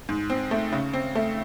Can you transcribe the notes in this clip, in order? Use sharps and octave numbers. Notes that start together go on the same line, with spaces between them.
G#2
C4
A3
C#3
C4
A3